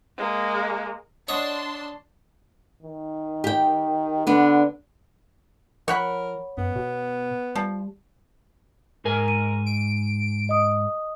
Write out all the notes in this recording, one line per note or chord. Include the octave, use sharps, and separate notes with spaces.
G#3 A#3
D4 C#5 D#5 F#5 A5 C6
D#3
G4 G5
D3 B3 D4
F3 A#4 C#5 F#5 B5
F#2 B3
B2
F3 G3
G#2 G#4 A#4 G#5
D#7
D7
D#5 D#6